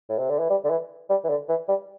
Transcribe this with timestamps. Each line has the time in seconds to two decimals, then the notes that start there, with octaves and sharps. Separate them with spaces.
0.09 A2
0.18 C3
0.30 D3
0.39 E3
0.50 G3
0.65 D3
0.70 E3
1.10 G3
1.24 E3
1.29 D3
1.49 E3
1.68 G3